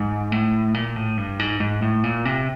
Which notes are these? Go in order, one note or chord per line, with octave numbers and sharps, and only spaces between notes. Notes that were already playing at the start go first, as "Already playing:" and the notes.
Already playing: G#2
A2
A#2
A2
G2
G#2
G#2
A2
A#2
C3